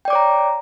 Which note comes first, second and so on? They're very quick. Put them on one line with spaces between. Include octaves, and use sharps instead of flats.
G5 D5 D6 C#5 A#5